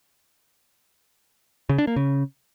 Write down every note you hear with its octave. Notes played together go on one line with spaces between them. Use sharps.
C#3
D4
A#3
C#3